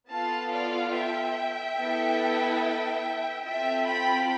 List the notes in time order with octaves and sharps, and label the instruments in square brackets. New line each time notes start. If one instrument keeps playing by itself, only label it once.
[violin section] B3 F4 A4 F5 A5
D5 F5
E5 G5
B3 E4 A4
C4 F4 A4 E5 G5
G5 B5